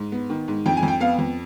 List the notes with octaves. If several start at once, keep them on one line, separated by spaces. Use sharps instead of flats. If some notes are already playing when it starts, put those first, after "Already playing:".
Already playing: G#2
B3
D#3
G#2
F2 G5
G#5
F2
G5
B3 F5
F2